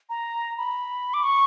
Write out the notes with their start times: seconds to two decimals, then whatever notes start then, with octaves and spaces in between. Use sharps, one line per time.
0.10 A#5
0.58 B5
1.14 D6
1.23 C#6